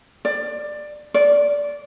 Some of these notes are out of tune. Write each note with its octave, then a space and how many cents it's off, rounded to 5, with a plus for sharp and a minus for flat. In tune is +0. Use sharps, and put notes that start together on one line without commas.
D5 +15
D5 -15